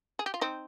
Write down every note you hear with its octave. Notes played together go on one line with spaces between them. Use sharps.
G#4
G4
F4
C4 D#4